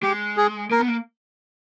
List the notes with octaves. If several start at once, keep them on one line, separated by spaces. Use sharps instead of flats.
G#3 G4
G#4
A#3 A#4
B3
A#3